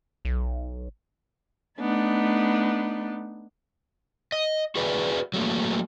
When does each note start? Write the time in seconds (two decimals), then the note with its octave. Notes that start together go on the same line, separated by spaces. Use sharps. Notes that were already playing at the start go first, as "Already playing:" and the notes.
0.25 B1
1.80 A3 B3 D4 D#4
4.32 D#5
4.75 F#4 G#4 B4 D5 E5
5.34 F#3 A3 A#3